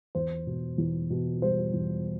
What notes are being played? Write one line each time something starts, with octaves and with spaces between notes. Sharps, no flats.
E2 C5
B2
E2
B2
G3 C5
E2